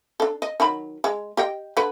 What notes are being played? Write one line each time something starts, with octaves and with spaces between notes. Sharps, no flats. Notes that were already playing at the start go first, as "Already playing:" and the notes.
D4 A4
D#5
D#3 F#3 B5
G#3
G4 D#5 G5
D3 D4 B4